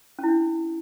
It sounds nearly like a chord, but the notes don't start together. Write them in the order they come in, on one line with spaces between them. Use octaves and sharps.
C#4 E4 D4